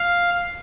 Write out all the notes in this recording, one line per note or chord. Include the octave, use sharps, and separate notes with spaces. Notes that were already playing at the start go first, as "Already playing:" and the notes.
Already playing: F5